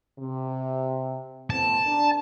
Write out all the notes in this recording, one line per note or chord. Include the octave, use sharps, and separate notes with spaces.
C3
A2 B3 C4 A5
D4 A#4